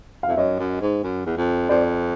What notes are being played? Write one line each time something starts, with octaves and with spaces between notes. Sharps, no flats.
F5
F2 E5
F#2 C#5 D#5
F#2
G#2
F#2
E2
F2
F2 C5 D5